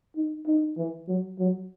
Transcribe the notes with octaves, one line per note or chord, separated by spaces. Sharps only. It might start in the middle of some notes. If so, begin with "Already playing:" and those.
D#4
D#4
E3
F#3
F#3